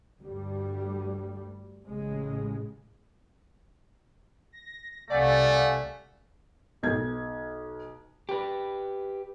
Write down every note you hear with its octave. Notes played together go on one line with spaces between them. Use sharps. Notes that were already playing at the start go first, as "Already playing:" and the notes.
D2 G2 G3
A1 C#3 G#3
A#6
C2 A3 D5 F5 F#5 G#5
B1 G#6
G4 B4